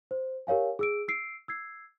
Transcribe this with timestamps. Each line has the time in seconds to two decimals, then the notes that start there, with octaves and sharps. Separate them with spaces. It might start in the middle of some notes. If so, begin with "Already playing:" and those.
0.11 C5
0.47 G4 A#4 C#5 F5 G#5
0.79 G#4 E6 D7
1.08 E6 C7 D7
1.48 E6 G#6 C7